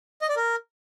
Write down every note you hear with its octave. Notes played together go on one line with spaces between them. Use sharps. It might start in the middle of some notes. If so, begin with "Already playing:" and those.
D#5
D5
A#4